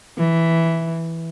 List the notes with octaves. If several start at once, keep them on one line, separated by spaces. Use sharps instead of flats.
E3